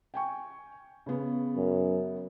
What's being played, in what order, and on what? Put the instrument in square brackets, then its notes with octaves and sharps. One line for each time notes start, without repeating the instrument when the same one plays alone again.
[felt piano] G5 G#5 C#6
C#3 B3
[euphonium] F#2